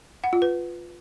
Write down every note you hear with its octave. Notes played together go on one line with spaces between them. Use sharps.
F#5
F4
B4